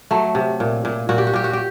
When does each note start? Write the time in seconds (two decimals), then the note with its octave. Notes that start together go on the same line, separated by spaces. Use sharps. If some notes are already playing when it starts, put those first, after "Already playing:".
0.11 F#3 A3
0.35 C3
0.60 A#2
0.85 A#2
1.09 A#2 F#4
1.18 G4
1.27 F#4
1.33 A#2 G4
1.44 F#4
1.53 G4